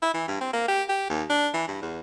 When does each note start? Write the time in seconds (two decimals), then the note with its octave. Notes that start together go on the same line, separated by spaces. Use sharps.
0.02 E4
0.14 E3
0.28 G2
0.41 C4
0.53 A#3
0.68 G4
0.89 G4
1.10 D#2
1.30 D4
1.54 E3
1.68 G2
1.82 E2